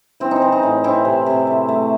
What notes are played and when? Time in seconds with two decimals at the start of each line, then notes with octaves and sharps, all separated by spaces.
0.20 E3 C4
0.31 C4 D#4
0.42 E3
0.52 D#4
0.63 A2
0.84 E3 C4 E4
1.05 C3
1.26 C3
1.47 A3
1.68 A3